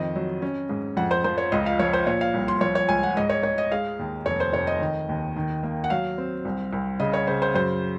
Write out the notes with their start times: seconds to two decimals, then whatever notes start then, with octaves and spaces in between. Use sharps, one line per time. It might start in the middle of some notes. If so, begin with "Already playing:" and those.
Already playing: F2 D#3 C4 D#5
0.15 F#3
0.42 C#4
0.69 G#2
0.97 F2 F#5
1.11 C5
1.24 F3 C5
1.38 C#5
1.52 C#2 D#5
1.66 F5
1.79 F3 C#5
1.93 C5
2.07 A#2 C#5
2.21 F5
2.34 C2
2.48 C6
2.61 F3 C#5
2.75 C#5
2.88 C#2 G#5
3.03 F#5
3.17 G#2 D#5
3.30 C#5
3.43 G#2 C#5
3.58 D#5
3.71 G#3 F5
3.99 D#2
4.26 F1 C#5
4.40 C5
4.53 F1 C#5
4.67 D#5
4.80 D#3
5.09 D#2
5.36 D#3
5.63 A#3
5.84 F#5
5.90 F#3 F5
6.18 C4
6.45 C2
6.73 C2
7.00 C#3 D#5
7.13 C#5
7.27 C#3 C5
7.42 C5
7.54 F#2 C5